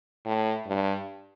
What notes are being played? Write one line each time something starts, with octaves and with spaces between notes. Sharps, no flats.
A2
G2